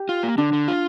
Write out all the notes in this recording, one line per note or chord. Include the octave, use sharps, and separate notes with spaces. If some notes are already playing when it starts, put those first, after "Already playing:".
Already playing: G4
F4
A#3
D3 D4
D3
F4